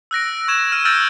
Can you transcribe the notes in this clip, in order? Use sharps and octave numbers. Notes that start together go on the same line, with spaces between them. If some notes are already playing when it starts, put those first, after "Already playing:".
E6 F#6 A#6 D7
C#6 G#6 E7
F6 D#7 E7
E6 F6 G6 A6 A#6 D7